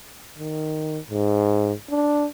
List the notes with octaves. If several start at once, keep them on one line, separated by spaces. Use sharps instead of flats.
D#3
G#2
D4